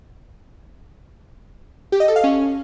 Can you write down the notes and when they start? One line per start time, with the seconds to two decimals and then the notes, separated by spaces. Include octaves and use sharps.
1.92 G4
2.00 D#5
2.08 A4
2.16 F5
2.24 C#4